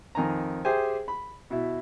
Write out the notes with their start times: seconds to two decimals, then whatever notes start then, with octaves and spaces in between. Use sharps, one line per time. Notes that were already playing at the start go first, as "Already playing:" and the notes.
0.15 F2 D#3 G#5 A#5
0.65 G4 G#4 C5 E5 G5 G#5
1.08 B5
1.50 B2 E4